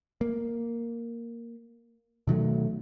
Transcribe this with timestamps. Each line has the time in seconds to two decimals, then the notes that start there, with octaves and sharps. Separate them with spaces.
0.21 A#3
2.27 B2 D#3 F#3 A3